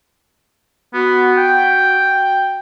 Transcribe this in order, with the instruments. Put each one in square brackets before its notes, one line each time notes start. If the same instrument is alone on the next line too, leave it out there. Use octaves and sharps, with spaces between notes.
[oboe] B3 [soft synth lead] F#4
[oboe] G5